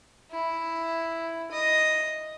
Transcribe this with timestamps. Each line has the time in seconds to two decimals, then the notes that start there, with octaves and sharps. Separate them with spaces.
0.31 E4
1.51 D#5